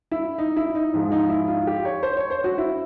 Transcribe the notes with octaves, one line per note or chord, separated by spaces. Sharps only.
E4
D#4
E4
D#4
G#2 F3 G#3
D#4
E4
F4
G4
C#5
C5
C#5
C5
F#4
E4